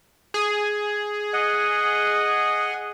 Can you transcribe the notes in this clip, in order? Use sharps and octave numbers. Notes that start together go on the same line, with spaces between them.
G#4
D#5 F#5